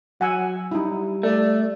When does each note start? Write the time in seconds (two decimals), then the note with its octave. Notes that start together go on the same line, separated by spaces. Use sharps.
0.21 F#3 F#5 G#5 E6
0.72 G3 D#4 E4
1.23 A3 D5